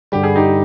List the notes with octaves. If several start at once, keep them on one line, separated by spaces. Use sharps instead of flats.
G2 D3 G3 G4
G#4
D#4 G4